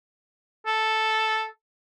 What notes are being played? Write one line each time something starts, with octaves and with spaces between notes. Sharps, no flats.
A4